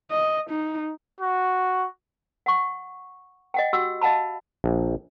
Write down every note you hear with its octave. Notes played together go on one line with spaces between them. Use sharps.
D#5
D#4
F#4
F#5 C#6
D#5 F#5 G5
F#4 G4 F#5 E6
D#5 F5 F#5 A5 B5
A#1